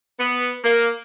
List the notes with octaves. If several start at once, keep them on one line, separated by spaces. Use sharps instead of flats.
B3
A#3